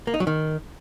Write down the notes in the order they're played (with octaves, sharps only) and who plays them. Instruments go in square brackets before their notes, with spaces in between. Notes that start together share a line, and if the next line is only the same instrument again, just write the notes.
[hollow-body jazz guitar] A#3
D#4
F#3
D#3